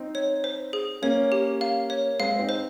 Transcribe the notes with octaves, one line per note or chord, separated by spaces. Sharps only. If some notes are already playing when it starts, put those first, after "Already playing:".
Already playing: C4 D#4
C#5
C5
G#4
A#3 C#4 C#5
G4
F5
C#5
G#3 C4 F5
C4 D#4
C5